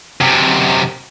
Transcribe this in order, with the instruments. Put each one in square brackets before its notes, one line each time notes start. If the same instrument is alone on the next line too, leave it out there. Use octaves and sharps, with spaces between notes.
[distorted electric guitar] F#2 C3